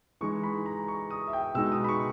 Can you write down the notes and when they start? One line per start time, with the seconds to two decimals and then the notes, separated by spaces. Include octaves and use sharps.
0.21 E3 G#3 D#4 C#6
0.43 B5
0.66 A#5
0.88 C#6
1.10 D#6
1.28 E5
1.33 G5
1.55 B2 G#3 D#4 E6
1.72 D#6
1.84 B5
1.89 C#6